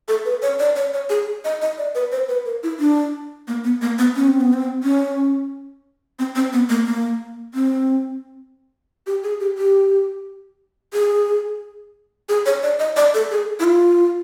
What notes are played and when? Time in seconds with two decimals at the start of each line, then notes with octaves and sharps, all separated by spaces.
0.08 A4
0.25 B4
0.42 C#5
0.59 D5
0.76 C#5
0.93 C#5
1.10 G#4
1.45 D#5
1.61 D#5
1.78 D5
1.95 B4
2.12 C5
2.29 B4
2.45 A#4
2.63 E4
2.79 D4
3.48 A#3
3.64 B3
3.81 A#3
3.99 B3
4.16 C#4
4.28 C4
4.41 B3
4.53 C4
4.83 C#4
6.19 C4
6.35 C4
6.53 B3
6.69 A#3
6.86 A#3
7.54 C4
9.07 G4
9.24 G#4
9.40 G4
9.58 G4
10.93 G#4
12.29 G#4
12.46 C#5
12.63 D5
12.79 D#5
12.97 D5
13.14 A4
13.31 G#4
13.60 E4
13.64 F4